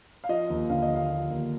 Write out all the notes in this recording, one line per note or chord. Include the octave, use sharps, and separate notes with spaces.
F5
F3 D#5
D#2
D3 F5
D#5
D#2
F5
F3
D#2